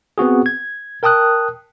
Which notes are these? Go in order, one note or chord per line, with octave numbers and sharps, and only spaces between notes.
B3 C4 F#4 G#4
G#6
A#4 G5 A5 D#6 F#6